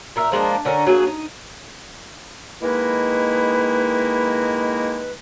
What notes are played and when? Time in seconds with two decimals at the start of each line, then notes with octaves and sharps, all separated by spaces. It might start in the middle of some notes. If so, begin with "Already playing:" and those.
0.16 A#2 A#4 E5
0.32 F3 G#3 A#3 D4
0.65 D3 C#4 A#4
0.87 F#3 A#3 G#4
1.07 D#4
2.62 D#3 G#3 A#3 D#4 E4 B4